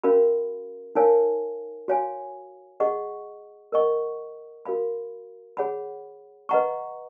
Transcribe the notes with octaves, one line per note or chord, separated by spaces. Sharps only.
C#4 F#4 A#4 F5 B5
D#4 A#4 C#5 F5 G#5
F#4 C#5 F5 G#5
G#4 D#5 F#5 C#6
A#4 D#5 F#5 C#6
F#4 A#4 F5 B5
G#4 C#5 F#5 B5
B4 D#5 F#5 A#5 C#6